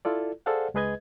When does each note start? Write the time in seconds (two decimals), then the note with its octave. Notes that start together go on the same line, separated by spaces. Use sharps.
0.05 E4 F4 A4 D5
0.46 G#4 A4 C5 D5 F5 F#5
0.74 C#2 G#3 G#4 B4 D#5 G#6